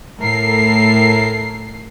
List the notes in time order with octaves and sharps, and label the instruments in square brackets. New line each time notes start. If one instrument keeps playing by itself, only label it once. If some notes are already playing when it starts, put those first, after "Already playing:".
[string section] A2 A4 A#4 C7